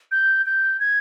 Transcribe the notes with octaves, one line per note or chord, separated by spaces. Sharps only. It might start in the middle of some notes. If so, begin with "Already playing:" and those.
G6
G6
G#6